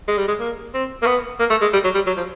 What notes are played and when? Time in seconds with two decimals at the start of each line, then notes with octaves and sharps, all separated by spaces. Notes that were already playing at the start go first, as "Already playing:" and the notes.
0.08 G#3
0.18 G3
0.28 G#3
0.40 A#3
0.74 C4
1.02 A#3
1.06 B3
1.40 A#3
1.50 A3
1.62 G#3
1.73 G3
1.84 F#3
1.95 G3
2.07 F#3
2.17 F3